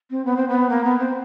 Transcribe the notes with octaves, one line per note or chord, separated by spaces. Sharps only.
C4
B3
C4
B3
A#3
B3
C4